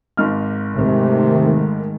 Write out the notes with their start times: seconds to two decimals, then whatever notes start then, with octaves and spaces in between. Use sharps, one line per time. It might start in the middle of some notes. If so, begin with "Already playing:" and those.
0.17 G#1 G#2 F6
0.76 C3 D#3 G#3 A3